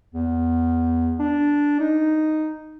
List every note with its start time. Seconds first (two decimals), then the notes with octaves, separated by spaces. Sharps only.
0.14 E2
1.19 D4
1.80 D#4